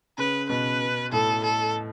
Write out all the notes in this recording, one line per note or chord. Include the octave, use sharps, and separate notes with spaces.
C#3 B4
B2 B4
A2 A4
A4